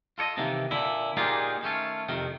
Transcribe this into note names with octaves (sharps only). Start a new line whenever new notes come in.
F4 A4 C#5 D#5
C3 D#3 E3 A#3
A#2 D3 E4
A#2 A#3 D#4 F4 G4 G#4
D#3 A3 C#4 F4
F2 C3 D#3